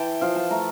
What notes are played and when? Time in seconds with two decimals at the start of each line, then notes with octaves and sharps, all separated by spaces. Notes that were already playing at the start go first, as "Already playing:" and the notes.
Already playing: E3 E4 G5 A5
0.21 F3 F5
0.36 A5
0.51 A3 A#5